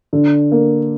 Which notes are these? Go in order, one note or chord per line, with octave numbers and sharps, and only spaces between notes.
D3
A#3